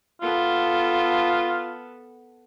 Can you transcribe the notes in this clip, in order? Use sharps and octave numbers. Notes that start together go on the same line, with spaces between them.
B3 F4 A4